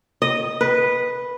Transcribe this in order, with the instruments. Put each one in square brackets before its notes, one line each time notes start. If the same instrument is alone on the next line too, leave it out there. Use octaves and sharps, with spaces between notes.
[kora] D#5
B4